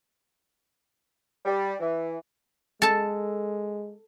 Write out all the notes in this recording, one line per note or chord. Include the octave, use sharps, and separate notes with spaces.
G3
E3
G#3 A4 A5